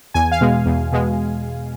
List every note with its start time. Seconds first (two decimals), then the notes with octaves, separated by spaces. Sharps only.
0.14 E2 G#5
0.32 F5
0.41 B2 G#3
0.66 E2
0.92 B2 G#3